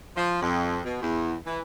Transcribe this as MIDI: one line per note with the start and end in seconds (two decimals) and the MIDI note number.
0.16 0.39 53
0.41 0.79 41
0.84 0.99 47
1.02 1.35 40
1.46 1.59 52